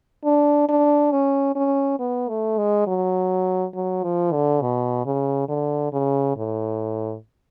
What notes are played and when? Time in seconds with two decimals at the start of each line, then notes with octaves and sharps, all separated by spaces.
0.25 D4
0.69 D4
1.11 C#4
1.55 C#4
1.99 B3
2.29 A3
2.58 G#3
2.87 F#3
3.74 F#3
4.03 F3
4.32 D3
4.61 B2
5.05 C#3
5.49 D3
5.93 C#3
6.37 A2